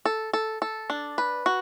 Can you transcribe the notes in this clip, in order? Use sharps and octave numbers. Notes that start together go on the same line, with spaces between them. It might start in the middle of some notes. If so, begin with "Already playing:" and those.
A4
A4
A4
D4
B4
F#4